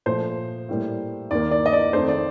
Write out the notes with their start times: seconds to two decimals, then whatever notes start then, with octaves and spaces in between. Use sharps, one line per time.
0.06 A#2 F3 A3 C5
0.69 A2 G3 A#3
1.31 D#2 D#3 A#3 D5
1.51 D5
1.66 D#5
1.73 D5
1.93 F2 D#3 A3 C5
2.09 D5